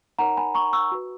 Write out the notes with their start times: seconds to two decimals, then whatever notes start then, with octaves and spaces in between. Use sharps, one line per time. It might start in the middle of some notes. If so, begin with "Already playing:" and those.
0.19 D#4 A#4 C#5 F#5 A#5
0.37 G#5 B5
0.55 A#5 C#6
0.73 C#6 E6
0.92 F#4 B4